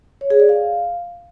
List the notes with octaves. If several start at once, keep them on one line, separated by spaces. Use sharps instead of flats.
C#5
G#4
D5
F5